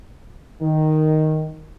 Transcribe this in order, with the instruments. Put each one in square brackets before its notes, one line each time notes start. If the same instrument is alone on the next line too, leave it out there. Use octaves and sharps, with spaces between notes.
[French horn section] D#3